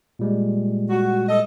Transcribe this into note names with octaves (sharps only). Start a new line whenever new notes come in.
A#2 G3 G#3
F#4
A4 D#5